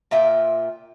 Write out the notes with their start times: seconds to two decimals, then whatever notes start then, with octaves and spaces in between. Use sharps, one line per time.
0.11 A#2 F4 E5 G5